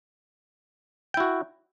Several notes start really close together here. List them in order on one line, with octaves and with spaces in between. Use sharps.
G5 E4 F#4